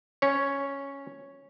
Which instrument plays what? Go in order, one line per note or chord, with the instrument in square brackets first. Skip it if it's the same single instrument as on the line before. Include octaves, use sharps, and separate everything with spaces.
[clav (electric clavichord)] C#4 C#5